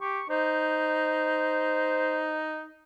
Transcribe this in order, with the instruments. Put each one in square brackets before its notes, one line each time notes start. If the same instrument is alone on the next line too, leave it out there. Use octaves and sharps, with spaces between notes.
[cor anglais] G4 [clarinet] C#6
[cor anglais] D#4 [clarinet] C5